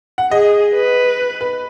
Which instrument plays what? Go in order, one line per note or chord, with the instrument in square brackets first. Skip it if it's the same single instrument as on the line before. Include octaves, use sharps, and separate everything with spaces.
[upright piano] F#5
[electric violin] G#4 [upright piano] D#5
[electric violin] B4
[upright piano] B4